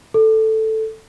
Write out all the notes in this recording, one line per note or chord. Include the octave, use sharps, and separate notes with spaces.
A4